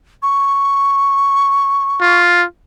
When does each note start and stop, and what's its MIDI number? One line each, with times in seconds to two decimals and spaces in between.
0.23 2.20 85
2.01 2.45 65